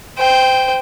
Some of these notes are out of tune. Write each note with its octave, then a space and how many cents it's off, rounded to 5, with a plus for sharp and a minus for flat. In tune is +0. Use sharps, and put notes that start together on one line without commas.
C5 -20 G5 +0